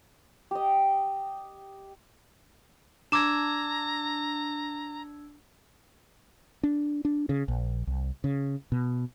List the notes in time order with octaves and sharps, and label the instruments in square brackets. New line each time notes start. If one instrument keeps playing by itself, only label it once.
[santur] G4 D#5
[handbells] D4 E6 G#6 [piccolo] A#5 [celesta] D6 E7
[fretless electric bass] D4
D4
C#3
A#1
C2
C#3
B2